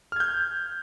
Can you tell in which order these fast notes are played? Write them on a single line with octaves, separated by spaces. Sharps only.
F6 G#6 G6